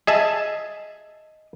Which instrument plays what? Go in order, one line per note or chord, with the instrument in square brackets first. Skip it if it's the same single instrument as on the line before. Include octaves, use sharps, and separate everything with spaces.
[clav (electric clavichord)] G#4 E5 A5 [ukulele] D#5